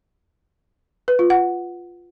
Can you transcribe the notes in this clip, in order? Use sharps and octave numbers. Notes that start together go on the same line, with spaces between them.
B4
F4
F#5